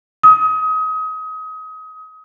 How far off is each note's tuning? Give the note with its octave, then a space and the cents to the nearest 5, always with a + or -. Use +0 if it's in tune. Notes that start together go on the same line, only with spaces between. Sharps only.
D#6 +30